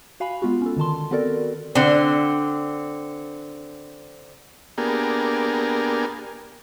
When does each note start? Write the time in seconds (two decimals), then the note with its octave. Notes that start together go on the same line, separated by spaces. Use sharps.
0.20 F#4 F5 G#5 B5
0.42 G#3 B3 F4 F#4
0.62 C#4 A4
0.77 D3 D#3 A5 C6
1.11 B3 C4 F#4 A4 A#4 D5
1.75 D3 C4
4.78 A#3 B3 D4 G4 G#4 A#4